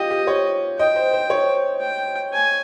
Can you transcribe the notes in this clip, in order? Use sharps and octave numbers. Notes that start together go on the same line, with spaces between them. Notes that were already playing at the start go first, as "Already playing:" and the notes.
Already playing: F4 G4 D#5
G4
C#5
D#5 G5
C5
C5
C#5
G5
G#5